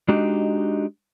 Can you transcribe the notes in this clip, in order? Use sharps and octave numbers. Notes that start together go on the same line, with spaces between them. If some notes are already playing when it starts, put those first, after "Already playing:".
G#3 D4 D#4 F#4 G4